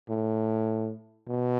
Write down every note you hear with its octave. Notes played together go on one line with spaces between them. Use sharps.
A2
B2